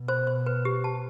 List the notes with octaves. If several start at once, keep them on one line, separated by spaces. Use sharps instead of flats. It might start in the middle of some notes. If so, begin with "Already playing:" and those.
Already playing: B2
C5
C5
B4
G4
A5